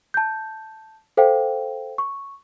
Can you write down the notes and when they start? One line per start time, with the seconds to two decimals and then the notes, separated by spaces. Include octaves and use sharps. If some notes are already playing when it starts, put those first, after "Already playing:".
0.14 A5 G6
1.17 A4 C5 F5 G5
1.98 C#6